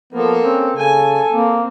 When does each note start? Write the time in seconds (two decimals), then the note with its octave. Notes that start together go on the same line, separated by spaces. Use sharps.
0.13 F3 A#3 B3 A4
0.43 C4 C#4
0.76 C#3 A4 G#5
1.32 A#3 C4